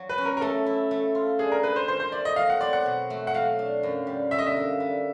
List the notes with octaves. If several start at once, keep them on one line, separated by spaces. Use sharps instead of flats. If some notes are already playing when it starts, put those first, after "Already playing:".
Already playing: F#3
B4
C#4
A#4
A#4
A3 A4
E4
A3
F4
D4 G#4
A#4
G#4 B4
C5
D#3 C5
C5
A3 D5
D#5
F#3 F5
F#5
C4 D5
F#5
B2
A3
F#5
F#3 F5
D4
F#2
G3
D3 E5
D#5
E5
A#3
G3